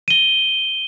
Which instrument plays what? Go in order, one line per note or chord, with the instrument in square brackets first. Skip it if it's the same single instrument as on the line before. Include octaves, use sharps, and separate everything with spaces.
[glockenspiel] D#7 G7